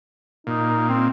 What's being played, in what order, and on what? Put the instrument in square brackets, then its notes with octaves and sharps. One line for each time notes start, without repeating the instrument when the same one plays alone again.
[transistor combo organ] A#2 [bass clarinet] D#4
[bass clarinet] C4